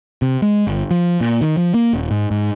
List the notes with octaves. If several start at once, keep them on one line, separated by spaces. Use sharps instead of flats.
C3
G#3
G1
F3
A#2
D#3
F3
A#3
D#1
G#2
G#2